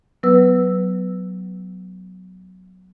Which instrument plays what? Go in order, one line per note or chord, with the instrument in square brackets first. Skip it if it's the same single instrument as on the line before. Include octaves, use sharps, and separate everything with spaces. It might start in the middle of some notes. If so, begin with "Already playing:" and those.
[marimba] F#3 B3 B4 E6